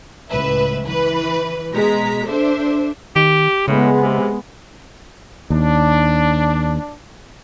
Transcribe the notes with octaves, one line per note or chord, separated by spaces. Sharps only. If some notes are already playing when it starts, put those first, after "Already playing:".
C#2 A2 B4 E5
E3 B4
B2 G#3 A#5 B6
D4 A4 C5 E5
D#3 G4
A2 C#3 G#3 B3
C3
D#2 D4